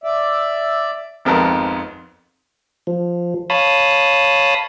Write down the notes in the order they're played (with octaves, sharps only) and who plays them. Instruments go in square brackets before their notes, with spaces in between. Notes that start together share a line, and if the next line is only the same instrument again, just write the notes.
[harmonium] D5 E5
[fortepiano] G#1 F2 B3 A#4 A5
[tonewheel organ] F3
C#5 F5 A5 B5 D#6